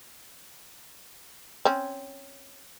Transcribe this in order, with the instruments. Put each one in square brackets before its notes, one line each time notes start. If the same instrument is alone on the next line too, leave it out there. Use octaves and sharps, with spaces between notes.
[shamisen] C4 C#4